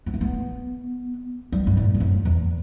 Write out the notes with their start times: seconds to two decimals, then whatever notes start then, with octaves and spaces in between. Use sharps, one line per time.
0.06 B3
0.14 A3
0.21 B3
1.52 G3
1.67 G2
1.77 A2
1.95 G2
2.00 F#2
2.25 E2